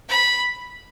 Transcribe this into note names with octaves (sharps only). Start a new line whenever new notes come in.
B5